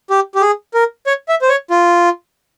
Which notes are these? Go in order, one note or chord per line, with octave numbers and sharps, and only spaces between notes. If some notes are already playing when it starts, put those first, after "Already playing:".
G4
G4
G#4
A#4
C#5
E5
C5
C#5
F4